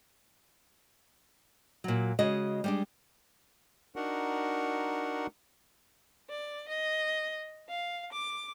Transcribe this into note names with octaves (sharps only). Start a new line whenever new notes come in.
A#2 F#3
C#3 G#3 F#4 D#5
G3 G#3 D4
D4 D#4 F#4 A#4 F#5
D5
D#5
F5
D6